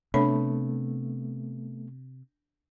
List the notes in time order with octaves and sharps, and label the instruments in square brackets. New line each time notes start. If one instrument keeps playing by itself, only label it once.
[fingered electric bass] C3 [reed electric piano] A3 B3 [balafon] D4 C#5 B5